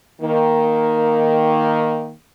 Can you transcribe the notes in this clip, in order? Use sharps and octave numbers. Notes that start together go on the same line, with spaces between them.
D#3 A#3